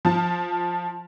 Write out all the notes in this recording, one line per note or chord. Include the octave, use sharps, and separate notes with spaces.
F3 A5